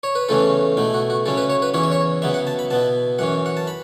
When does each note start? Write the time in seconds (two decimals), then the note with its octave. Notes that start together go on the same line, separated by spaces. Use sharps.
0.03 C#5
0.15 B4
0.29 E2 C#3 E3 A3 C#4 A4
0.77 B2 A3 E4
0.94 F#4
1.10 F#4
1.26 C#3 F#3 C#4 E4 A4
1.37 B4
1.50 C#5
1.62 B4
1.74 E2 E3 C#4 E4 C#5
1.83 E5
1.92 C#5
2.22 C#3 F#3 B3 E4 E5
2.34 F#5
2.47 A5
2.59 B5
2.70 B2 B3 E4 A5
3.19 F#2 E3 C#4 F#5
3.46 F#5
3.57 A5
3.67 B5